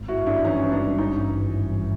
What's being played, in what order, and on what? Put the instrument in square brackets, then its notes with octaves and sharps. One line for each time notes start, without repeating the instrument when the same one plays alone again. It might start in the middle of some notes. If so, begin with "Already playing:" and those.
Already playing: [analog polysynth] G#1
[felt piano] E4 F#4
[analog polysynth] G2
[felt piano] D4 E4
[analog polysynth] E3 [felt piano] C#4 D#4
[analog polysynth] G#1 [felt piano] D4
[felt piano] C#4 D#4